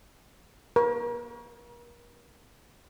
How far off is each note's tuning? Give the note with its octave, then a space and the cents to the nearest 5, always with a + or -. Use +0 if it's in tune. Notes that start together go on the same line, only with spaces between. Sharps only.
A#4 +40